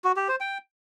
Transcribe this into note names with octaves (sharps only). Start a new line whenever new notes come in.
F#4
G4
C5
G5